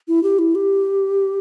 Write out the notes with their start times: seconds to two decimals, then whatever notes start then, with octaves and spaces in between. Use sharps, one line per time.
0.08 E4
0.23 G4
0.39 E4
0.55 G4